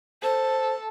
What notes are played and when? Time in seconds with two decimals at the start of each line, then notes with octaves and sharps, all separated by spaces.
0.23 A4 C5